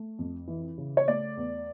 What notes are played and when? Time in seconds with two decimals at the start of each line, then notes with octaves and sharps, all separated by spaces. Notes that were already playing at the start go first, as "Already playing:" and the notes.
Already playing: A3
0.19 F2
0.48 E3
0.78 C#3
0.97 C#5
1.08 A3 D5
1.37 E2